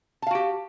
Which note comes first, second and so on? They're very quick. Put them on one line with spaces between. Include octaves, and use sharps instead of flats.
A5 F5 F#4 G4